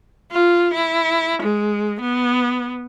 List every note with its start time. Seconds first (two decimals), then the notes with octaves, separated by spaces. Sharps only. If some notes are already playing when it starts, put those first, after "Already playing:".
0.32 F4
0.74 E4
1.42 G#3
2.01 B3